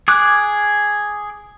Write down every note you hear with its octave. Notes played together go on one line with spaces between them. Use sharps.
G#4 D6 F#6